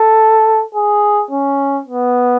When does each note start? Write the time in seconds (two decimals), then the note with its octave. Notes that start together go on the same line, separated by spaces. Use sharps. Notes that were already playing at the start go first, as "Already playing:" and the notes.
Already playing: A4
0.75 G#4
1.31 C#4
1.86 B3